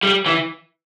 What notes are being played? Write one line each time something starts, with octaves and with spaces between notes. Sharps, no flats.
G3
E3